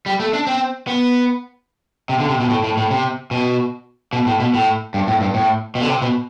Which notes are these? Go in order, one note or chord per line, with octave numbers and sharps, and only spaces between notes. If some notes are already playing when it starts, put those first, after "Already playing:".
G3
A3
D4
C4
B3
C3
D3
C3
B2
A2
A2
A2
C3
B2
B2
A2
B2
A2
G2
A2
G2
A2
B2
D3
C3
B2